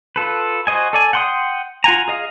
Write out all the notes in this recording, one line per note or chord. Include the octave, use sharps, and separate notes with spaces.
F4 A4 B4
F#4 C5 D#5 G#5
A4 D5 G#5
F#5 G5 C6 C#6 D#6
F4 F#5 G#5 A#5
G#4 D#5 F5